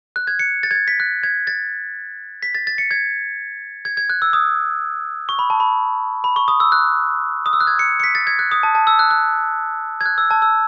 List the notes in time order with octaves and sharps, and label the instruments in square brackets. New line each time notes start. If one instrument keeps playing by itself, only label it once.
[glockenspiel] F#6
G#6
C#7
A6
G#6
A6
B6
F#6
G#6
A6
B6
A6
A6
C#7
G#6
G#6
G#6
F#6
E6
D#6
C#6
B5
A5
B5
B5
C#6
D#6
E6
F#6
D#6
E6
F#6
G#6
C#7
C#7
B6
A6
G#6
F#6
D#6
A5
A5
E6
F#6
F#6
G#6
F#6
E6
A5
E6